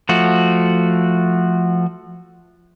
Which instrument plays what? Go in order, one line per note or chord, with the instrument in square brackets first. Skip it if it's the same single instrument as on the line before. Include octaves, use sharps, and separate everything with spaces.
[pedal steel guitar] F3 A3 F#4